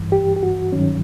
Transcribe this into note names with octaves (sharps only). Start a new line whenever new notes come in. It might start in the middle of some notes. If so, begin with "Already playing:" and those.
Already playing: G2 E3
G4
G4
F#4
G2 D#3 F#3 C#4